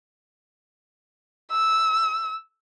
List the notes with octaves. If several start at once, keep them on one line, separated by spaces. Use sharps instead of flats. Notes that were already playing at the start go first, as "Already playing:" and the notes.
E6